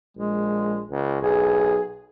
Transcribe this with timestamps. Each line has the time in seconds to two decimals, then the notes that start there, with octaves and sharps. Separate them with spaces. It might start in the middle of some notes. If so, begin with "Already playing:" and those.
0.17 A#1 G#3
0.90 C#2
1.22 B1 G#4